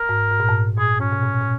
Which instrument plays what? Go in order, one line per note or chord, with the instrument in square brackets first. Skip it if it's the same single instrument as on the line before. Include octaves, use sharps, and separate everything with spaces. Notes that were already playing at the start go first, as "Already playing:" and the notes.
Already playing: [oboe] A#4
[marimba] G#2
G#2
A#2
G#2
[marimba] A#2 [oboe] G#4
[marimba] G#2 [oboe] C#4
[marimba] B2
A#2
A#2